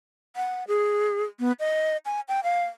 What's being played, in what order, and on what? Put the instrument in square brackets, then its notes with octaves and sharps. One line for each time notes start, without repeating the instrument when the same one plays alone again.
[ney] F#5
G#4
B3
D#5
G#5
G5
F5